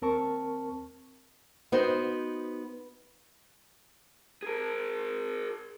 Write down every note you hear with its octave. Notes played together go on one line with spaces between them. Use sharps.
D#2 C4 A#4 A5 C#6
B3 D#4 F#4 C5
G#4 A#4